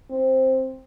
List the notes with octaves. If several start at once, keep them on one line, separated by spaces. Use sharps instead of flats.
C4